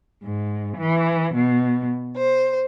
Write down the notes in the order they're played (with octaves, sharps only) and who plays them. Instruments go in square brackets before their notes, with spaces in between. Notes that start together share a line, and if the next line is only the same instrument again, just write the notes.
[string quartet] G#2
E3
B2
C5